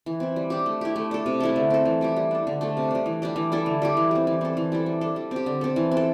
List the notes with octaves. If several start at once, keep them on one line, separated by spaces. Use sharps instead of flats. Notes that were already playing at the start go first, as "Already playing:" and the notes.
E3
C4 E4
G3
D4 G4
A3
E4 G4
A3
D4 A4
C3
A3 E4 A4
D3
C4 A4
E3
G3 E4 G4
G3
D4 A4
D3
A3 D4 A4
C3
G3 D4
E3
G3 D4 G4
E3
G3 E4 A4
D3
G3 E4 G4
E3
G3 C4
E3
C4 A4
E3
G3 E4 A4
G3
D4 A4
G3
C4 G4
D3
C4 A4
E3
C4
A4